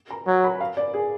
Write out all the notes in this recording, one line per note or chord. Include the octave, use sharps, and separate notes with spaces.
A#5
F#3
B5
F5
D5
G#4